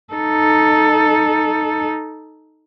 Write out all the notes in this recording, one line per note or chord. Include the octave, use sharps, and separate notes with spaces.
D#4 A4